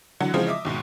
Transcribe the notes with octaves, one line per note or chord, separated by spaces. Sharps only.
D3 E3 F#3 F#5
C#3 E3 F3 G#3 C4 F4
D#5 E5 D6
D#2 G#2 B2